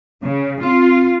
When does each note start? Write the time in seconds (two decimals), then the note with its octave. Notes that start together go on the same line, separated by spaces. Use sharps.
0.24 C#3
0.63 C4 F4